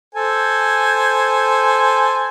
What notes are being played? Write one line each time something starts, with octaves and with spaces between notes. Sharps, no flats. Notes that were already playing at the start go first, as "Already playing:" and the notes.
A4 C5 G#5